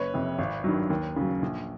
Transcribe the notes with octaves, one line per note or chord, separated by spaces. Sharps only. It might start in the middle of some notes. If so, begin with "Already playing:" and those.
Already playing: F#1 B4 C#5
F2 C3
G#1
G2 D#3 F#3
D#2
C#3
F#3
A#1